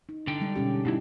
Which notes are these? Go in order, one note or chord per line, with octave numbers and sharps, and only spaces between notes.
D#4
D3 G5
G3 G#3 D4
B2 C#4 G4
A2 B3 D#4 E4 G4